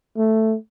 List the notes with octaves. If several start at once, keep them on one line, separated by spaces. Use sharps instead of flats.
A3